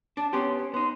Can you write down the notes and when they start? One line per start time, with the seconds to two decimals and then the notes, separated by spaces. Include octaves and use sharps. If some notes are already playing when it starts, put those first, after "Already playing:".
0.17 D4 A5
0.33 B3 C#4 G4 C6
0.57 C#5
0.74 B3 D#4 C6